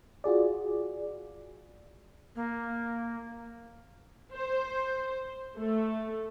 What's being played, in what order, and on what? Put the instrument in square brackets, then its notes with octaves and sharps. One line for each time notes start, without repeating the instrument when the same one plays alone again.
[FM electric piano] F4 F#4 G#4 D5
[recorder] A#3
[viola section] C5
A3